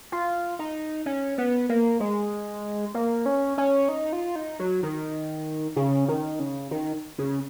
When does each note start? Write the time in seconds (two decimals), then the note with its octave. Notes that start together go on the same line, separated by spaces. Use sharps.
0.12 F4
0.59 D#4
1.06 C#4
1.38 B3
1.69 A#3
2.00 G#3
2.94 A#3
3.26 C#4
3.58 C#4
3.89 D#4
4.13 F4
4.36 D#4
4.59 F#3
4.83 D#3
5.76 C#3
6.08 D#3
6.40 C#3
6.71 D#3
7.18 C#3